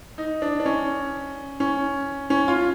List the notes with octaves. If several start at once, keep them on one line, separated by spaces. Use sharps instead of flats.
D#4
D4
D4
C#4
C#4
C#4
F4